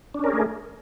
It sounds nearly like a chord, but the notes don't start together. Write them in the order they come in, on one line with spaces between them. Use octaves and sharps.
D4 C#4 A#4 G#4 A3